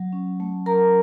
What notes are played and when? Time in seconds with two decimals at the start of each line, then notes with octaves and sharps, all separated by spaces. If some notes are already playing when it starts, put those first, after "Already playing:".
Already playing: F#3
0.13 C#4
0.40 A3
0.66 F#3 A#4 A#5